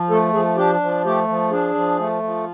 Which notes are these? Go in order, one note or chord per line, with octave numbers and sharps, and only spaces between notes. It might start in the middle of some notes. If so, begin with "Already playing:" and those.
Already playing: F3
A3 A4
F3 G#4
D4 G4
F3
A3 G4
F3
D4 G#4
F3
A3
F3